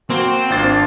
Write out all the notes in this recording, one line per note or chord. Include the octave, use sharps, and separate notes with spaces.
A#3 C4 F#4
G#1 D4 F4 A6 C7